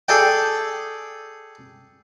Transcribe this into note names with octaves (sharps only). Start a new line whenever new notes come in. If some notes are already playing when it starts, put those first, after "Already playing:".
G#4 A4 D5 G5